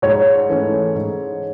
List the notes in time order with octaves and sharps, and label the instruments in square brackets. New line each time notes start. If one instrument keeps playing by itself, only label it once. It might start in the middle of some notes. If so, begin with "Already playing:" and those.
[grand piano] G#2 [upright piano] C#5
[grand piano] E3 A3 C#4
G#2